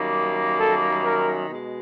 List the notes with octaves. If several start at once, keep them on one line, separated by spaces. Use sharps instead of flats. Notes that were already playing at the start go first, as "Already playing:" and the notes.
Already playing: F#2 D#3 G3 A#3
A4
A#4
B2 G#3